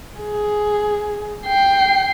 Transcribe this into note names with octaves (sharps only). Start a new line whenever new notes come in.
G#4
G5 C7